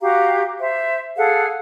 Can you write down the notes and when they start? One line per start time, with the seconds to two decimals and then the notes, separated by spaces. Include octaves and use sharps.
0.01 F#4 G4 F5 A#5
0.59 C5 E5
1.17 G#4 A4 F5 F#5